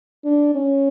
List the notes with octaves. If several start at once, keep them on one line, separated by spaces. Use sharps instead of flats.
D4
C#4